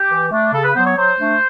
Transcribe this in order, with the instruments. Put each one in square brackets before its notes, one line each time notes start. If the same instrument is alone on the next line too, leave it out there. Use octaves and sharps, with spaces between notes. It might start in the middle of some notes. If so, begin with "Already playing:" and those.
Already playing: [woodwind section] G4
E3
A3 D4
C#3 A4
B4
F#3 B3 C5
C#5
F#3 C5
A3 D4